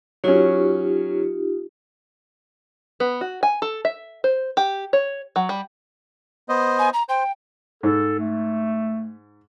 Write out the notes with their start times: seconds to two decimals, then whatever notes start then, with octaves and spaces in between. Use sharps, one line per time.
0.24 F#3 C#4 D#4 F4 G4
3.00 B3
3.21 F#4
3.43 G#5
3.62 A4
3.85 E5
4.24 C5
4.57 G4
4.93 C#5
5.36 F#3
5.49 G3
6.49 B3 C5 D#5
6.79 G#5
6.93 A#5
7.09 C5 G5
7.83 G#2 A4
8.19 A3